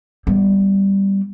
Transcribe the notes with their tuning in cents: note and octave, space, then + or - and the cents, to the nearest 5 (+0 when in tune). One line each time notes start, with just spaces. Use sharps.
G3 +0 B3 +0